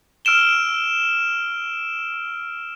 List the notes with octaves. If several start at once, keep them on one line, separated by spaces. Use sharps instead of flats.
E6 F6 D7 E7 G7